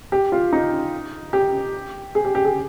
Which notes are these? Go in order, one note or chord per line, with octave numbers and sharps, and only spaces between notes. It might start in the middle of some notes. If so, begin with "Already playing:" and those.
G4
F4
D#4
G4
G#4
G4
G4
G#4